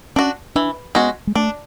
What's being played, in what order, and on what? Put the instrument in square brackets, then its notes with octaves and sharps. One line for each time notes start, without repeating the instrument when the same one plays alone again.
[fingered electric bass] C#4 [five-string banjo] D4 F#4
[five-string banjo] E3 [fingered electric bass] D4
[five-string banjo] G#3 C#4 F#4 [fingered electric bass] B3
[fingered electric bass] G#3
[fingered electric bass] A3 [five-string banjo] D4